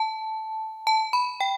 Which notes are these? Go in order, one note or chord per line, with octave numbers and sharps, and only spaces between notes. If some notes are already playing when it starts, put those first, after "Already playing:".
Already playing: A5
A5
B5
G5